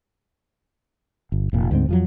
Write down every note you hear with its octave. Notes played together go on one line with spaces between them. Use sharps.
G1
F1 A#2
D2 G#2 C4
F2 F3 F#3